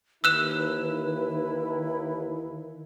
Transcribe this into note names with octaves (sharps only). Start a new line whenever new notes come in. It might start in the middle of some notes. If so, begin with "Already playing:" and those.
D#2 D#3 E4 B4 E6 F#6 E7